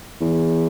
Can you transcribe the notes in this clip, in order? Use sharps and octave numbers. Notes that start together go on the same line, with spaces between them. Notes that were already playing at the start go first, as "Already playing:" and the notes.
E2